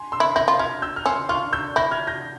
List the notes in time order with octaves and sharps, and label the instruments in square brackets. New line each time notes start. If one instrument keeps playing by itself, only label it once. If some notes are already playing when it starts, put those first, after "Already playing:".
Already playing: [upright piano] G#5 C6
C6 E6
[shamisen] E4
[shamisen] E4 [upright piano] G6 A#6
[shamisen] F4
[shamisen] E4 [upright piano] F6 G#6
[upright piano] E6 G6
F6
[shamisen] C#4 [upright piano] C6 E6
[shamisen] F4 [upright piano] C#6 F6
[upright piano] E6 G6
[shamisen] E4 [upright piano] G6 A#6
[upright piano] F6 G#6
G6 A#6